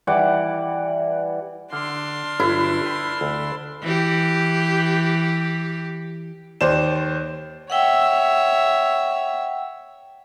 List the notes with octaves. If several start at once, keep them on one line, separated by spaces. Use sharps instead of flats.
E3 G3 F#5 D6
D3 D4 C6 F6
G1 F#3 E4
B4 G5
D2
E3 G4
D#2 C5 D5 E7
C#5 E5 F#5 G5